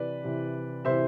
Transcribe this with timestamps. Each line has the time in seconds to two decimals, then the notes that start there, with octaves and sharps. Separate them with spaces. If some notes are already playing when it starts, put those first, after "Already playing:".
Already playing: C3 E3 B4 D5
0.24 C3 E3
0.85 C3 E3 C5 E5